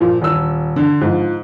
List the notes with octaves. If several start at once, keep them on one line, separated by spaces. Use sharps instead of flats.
A#2 F3
D#1 E6
D3
G#2 F3